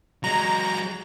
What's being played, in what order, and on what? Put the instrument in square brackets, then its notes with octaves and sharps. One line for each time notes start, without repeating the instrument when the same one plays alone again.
[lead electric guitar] F#3 G#3 [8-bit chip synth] A#5